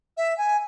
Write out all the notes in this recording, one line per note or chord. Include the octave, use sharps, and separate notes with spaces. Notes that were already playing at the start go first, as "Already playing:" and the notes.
E5
G#5